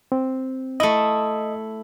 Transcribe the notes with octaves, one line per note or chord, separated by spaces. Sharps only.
C4
A3 E4 D#5 D#6